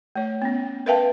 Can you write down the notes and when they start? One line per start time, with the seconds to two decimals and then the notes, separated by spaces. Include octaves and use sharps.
0.16 A3 C#5
0.42 B3 C#4
0.86 A#4 B4 E5 F5 G5 A5